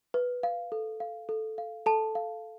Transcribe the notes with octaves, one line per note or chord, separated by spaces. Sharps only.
B4
F5
A4
F5
A4
F5
A4 A5
F5